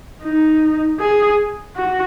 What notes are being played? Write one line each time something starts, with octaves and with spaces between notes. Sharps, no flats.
D#4
G#4
F#4